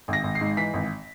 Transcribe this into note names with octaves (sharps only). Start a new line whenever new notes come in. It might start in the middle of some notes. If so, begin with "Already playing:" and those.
G#1 A#6
G#1
C7
G#2
E3 B6
G#1